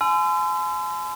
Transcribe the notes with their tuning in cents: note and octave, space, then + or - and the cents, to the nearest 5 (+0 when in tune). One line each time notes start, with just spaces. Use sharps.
G#5 +35 C6 -40 E6 +35